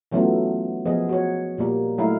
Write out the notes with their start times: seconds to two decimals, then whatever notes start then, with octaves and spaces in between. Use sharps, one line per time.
0.12 E3 F#3 A3 B3 C#4 F4
0.85 F3 B3 G#4 D#5
1.09 F#4 C#5
1.58 A#2 G3 A#3
1.98 F#3 A3 D#4 E4 F5